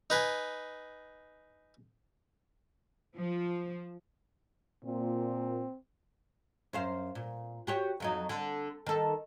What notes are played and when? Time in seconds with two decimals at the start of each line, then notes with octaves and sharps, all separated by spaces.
0.10 D#4 B4 G#5
3.18 F3
4.85 A#2 C4
6.73 F#2 C5 F5
7.15 A#2
7.67 F#4 G4 C#5
8.00 F2 F#3 D#4
8.29 D3
8.87 D#3 A4